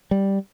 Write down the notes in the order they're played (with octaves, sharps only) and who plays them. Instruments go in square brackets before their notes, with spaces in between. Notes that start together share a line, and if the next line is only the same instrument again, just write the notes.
[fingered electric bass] G3